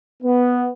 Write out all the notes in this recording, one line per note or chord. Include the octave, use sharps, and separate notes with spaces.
B3